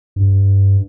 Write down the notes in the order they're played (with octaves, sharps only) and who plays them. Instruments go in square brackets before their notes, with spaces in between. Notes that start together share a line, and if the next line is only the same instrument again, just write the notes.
[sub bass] G2